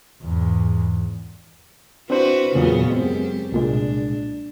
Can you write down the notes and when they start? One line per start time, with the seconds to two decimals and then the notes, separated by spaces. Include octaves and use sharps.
0.23 E2 G#2
2.10 C4 D4 E4 F#4 B4 C5
2.55 E2 A#2 C#3 F#3 B3
2.90 F#2 G#3 C4 G4
3.52 C2 A#2 G#3 D4